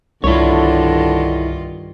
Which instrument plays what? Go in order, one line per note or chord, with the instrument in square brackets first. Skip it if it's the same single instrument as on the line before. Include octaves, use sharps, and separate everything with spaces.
[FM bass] C2 [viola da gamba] G2 D#3 F4 [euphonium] D3 [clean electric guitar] E4 C#5